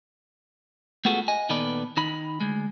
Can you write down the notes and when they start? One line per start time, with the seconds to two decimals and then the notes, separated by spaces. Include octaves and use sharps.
1.05 A3 B3 F4 F#4 G#4 A4
1.28 D#5 G#5
1.49 A#2 D#3 B3 A4 B4 D5
1.97 D#3 D#4 B5
2.40 D2 G#3